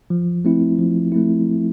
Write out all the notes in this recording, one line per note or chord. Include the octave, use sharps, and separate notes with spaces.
F3
A3 C4 E4
F3
A3 C4 E4